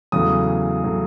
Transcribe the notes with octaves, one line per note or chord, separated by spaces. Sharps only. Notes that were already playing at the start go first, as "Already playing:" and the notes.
E2 C#3 F#3 A3 D#6
C#3 F#3 A3